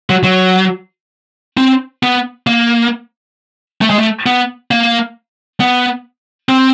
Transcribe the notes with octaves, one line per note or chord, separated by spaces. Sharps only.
F#3
F#3
C4
B3
A#3
A3
G#3
A3
B3
A#3
B3
C4